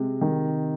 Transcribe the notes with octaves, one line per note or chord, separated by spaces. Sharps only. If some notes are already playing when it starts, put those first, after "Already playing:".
Already playing: C3 G#3
D#3